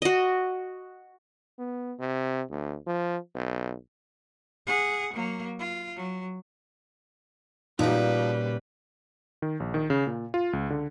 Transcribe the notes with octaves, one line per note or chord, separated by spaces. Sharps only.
F#4 D#5
B3
C3
D2
F3
B1
G#4 F#5
F#3 A#3
F4
F#3
A#2 C#3 F3 G3 D#4 F#4 B4
D#3
A#1
D#3
C#3
A#2
F4
C#2
D3